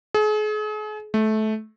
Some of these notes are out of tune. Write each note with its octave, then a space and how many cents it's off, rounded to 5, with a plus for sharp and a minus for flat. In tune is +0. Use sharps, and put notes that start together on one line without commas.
G#4 +40
A3 -20